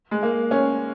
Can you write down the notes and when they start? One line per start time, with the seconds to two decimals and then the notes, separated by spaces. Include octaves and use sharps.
0.11 G#3
0.23 A#3
0.51 C#4